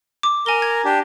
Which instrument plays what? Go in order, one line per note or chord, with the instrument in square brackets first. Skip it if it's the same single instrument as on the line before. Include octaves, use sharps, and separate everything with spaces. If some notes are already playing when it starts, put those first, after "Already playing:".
[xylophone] D6
[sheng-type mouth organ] A#4 [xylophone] G#5 G7
[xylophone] G#6
[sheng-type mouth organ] D4 G4